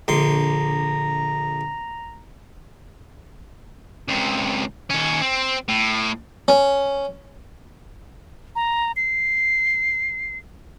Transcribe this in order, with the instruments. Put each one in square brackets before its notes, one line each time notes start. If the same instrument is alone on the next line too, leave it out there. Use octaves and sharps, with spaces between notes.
[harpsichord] A#1 D3 C6 [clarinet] A#5
[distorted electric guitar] C#2 C3
D#2 C#4
C4
A2
[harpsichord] C#4
[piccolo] A#5
C7